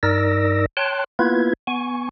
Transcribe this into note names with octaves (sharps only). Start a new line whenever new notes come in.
G2 D#4 A#4 D5 E6 A#6
C#5 G5 A5 C6 F#6
A#3 B3 E4 F4 B4 G#6
B3 G#5 C#6